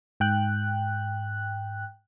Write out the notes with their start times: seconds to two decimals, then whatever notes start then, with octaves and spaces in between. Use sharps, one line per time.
0.20 G#2 G5 F#6